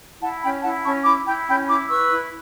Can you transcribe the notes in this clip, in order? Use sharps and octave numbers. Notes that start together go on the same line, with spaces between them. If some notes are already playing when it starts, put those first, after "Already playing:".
E4 F#5 A5
C#4 G5 B5
E4 F#5 A5
C#4 A5 C#6
E4 B5 D6
E4 G5 B5
C#4 G5 B5
E4 B5 D6
B4 C#6 E6
E4